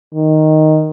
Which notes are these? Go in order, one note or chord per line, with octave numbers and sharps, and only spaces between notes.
D#3